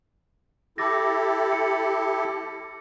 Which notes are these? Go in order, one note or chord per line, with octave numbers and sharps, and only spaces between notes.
E4 G4 A4 D6 A6 A#6
C#7